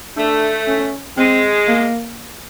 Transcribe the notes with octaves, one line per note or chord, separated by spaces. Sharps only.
A3 D4
C#4
G#3 C4
A#3